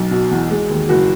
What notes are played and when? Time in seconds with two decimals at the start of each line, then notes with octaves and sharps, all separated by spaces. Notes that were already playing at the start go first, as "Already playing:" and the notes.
Already playing: B1
0.11 B2
0.31 E2
0.50 G#3
0.70 D#2
0.89 F#1 F#4